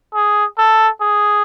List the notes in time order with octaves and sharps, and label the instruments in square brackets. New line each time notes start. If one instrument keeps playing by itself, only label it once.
[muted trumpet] G#4
A4
G#4